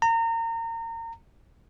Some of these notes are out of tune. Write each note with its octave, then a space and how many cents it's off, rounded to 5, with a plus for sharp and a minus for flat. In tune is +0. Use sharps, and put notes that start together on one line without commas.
A#5 -30